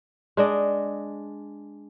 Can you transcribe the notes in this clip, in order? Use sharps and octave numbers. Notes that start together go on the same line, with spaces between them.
G#3 D4 D#5